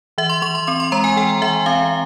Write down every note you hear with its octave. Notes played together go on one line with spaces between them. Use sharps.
E3 E5
C6
E3 C#6
C6
C4 C#6
C6
G#3 A#5
G#5
E3 G5
E3 E5
C4 F5